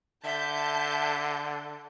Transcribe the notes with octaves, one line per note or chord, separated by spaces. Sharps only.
D3 E5 A5 G6